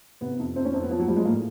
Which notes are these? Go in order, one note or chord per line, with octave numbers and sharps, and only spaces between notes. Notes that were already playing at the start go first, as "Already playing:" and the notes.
C3 B3
F2
F2 C4
C#4
F2 C4
B3
F3
F#3
F3 G3
G#3
A2 A#3